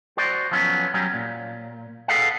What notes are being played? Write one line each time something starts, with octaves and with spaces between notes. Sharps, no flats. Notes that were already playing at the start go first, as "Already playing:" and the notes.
F#4 C5 D5
F3 F#3 B3 C#4
F#3 G3 C#4
A#2
G#4 A4 B4 F5 F#5